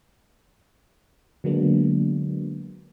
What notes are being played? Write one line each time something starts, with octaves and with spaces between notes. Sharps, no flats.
D3 F#3 G#3 A#3 B3 D4